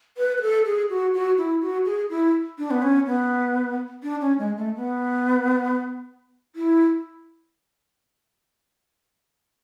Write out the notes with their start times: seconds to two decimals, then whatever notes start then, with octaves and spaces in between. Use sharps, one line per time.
0.18 B4
0.37 B4
0.42 A4
0.65 G#4
0.90 F#4
1.14 F#4
1.38 E4
1.61 F#4
1.85 G#4
2.10 E4
2.58 D4
2.71 B3
2.82 C#4
3.06 B3
4.03 D4
4.21 C#4
4.39 G#3
4.57 A3
4.76 B3
6.56 E4